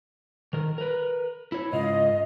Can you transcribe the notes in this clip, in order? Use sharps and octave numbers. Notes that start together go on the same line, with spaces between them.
D#3 A#4
A#4 B4
E4 C#5
G#2 C#3 F4 D#5